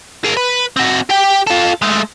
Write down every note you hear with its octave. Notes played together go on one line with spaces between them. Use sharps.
G#4 A#4
B4
C4 F#4
G4 G5
F4 A4
G#3 A3